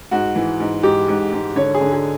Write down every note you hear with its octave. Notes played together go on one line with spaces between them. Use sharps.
G#2 F#4
E3
G#2
G#2 G4
G#2
G#2
D3 C#5
G#4
D3
G#4